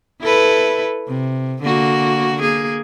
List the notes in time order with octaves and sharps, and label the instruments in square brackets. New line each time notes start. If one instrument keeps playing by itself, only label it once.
[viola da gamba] E4 A4 B4
C3
D3 A#3 F#4
A#3 G#4